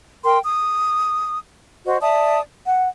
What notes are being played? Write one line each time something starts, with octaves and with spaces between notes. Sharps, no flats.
A#4 G5 C6
D#6
F#4 C5 D#5
D5 E5 A5 D#6
F#5